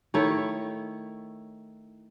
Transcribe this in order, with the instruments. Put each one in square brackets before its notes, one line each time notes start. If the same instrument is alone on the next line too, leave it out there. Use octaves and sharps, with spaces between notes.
[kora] D#3 A3 E4 C#5